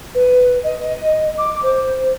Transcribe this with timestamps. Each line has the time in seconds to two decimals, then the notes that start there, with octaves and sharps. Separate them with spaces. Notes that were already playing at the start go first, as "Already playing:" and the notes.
0.15 B4
0.63 D#5
1.38 D6
1.63 C5